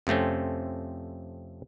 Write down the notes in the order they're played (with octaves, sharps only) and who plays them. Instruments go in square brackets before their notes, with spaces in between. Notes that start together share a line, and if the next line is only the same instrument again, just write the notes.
[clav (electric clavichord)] F2 C3 A3 C4 C#4